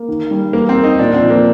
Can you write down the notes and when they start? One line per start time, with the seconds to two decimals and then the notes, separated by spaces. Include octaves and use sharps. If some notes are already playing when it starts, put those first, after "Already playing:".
Already playing: A#3
0.08 D#3
0.31 G3
0.53 G3 A#3
0.69 C4
0.76 A#3
0.84 D#4
0.99 A#2 D4
1.14 C4
1.23 F3
1.30 A#3